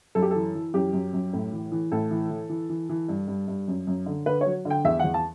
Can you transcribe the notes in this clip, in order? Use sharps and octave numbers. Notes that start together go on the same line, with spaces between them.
F#2 A4
G4
E3 A4
E3
F#2 G4
F#2
F#2
A2
E3
E3
A2 A4
E3
E3
E3
E3
E3
G2
G2
G2
F#2
F#2
D3
D3 B4
F#3 C#5
D3
G5
E2 E5
E2 F#5
A5